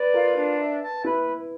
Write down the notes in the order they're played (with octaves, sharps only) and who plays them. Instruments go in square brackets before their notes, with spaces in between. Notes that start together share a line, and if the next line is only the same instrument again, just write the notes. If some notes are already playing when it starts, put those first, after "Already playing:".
Already playing: [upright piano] B4 [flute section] D5
[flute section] F4 [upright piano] A#4
[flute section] D4
E5
A5
[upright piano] E4 [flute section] B4